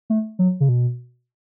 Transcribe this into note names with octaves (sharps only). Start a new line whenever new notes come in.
A3
F#3
C#3
B2